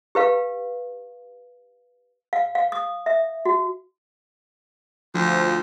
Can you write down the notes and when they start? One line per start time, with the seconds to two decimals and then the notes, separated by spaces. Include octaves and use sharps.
0.15 G4 B4 F5
2.33 F5
2.55 F5
2.72 D#6
3.06 E5
3.45 F#4
5.14 D2 F3